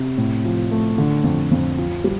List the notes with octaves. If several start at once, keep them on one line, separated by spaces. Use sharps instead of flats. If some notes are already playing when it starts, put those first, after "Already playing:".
Already playing: C3
A2
F3
A3
D3
F2
F2
F4
G3